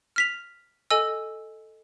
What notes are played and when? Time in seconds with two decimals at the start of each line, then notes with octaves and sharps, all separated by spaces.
0.16 F6 B6 F7
0.91 A4 D#5 G#5 E6